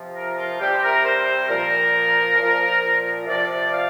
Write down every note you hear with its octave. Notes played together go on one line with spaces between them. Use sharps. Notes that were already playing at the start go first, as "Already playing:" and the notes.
Already playing: C3 F3
A#4
F4
C3 G3 G4
C5
A#4
C5
A#2 F3 A#4
A#2 F3
C3 F3 D5
F5